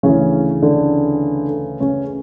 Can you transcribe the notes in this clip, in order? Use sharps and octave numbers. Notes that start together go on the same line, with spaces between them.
D2 C#3 E3 C#4
D3 D4
C#3 C#4